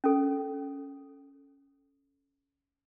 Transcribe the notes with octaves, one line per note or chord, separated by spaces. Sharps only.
C#4 A4